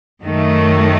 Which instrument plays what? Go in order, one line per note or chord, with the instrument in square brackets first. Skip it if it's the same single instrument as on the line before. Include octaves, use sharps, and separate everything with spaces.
[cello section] F#2 D#3 A3